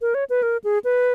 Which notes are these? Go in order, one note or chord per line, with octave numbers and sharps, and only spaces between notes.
A#4
C#5
B4
A#4
G#4
B4